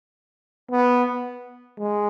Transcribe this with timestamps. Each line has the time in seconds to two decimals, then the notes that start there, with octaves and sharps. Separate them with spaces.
0.71 B3
1.79 G#3